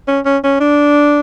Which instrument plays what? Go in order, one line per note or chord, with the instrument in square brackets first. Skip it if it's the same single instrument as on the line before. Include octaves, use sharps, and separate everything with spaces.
[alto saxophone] C#4
C#4
C#4
D4